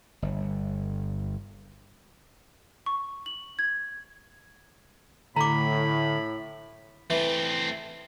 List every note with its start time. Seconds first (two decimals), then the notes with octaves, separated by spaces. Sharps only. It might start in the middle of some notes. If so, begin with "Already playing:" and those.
0.22 G1
2.86 C#6
3.26 F#7
3.59 G#6
5.36 A2 D3 A#5 B5 D6
7.10 E3 A3 C4